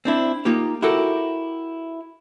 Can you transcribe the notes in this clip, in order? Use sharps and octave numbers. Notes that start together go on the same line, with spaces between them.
C4 D4 E4
A#3 D#4 F4 G4
E4 F#4 G4 A4 A#4